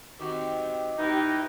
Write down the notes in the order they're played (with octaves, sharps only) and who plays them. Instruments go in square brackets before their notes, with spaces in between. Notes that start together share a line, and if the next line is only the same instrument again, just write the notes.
[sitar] D#3 F#4 [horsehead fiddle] C4 [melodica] G4
[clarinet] D#4 [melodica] E4 B4 D#5 [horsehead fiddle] G4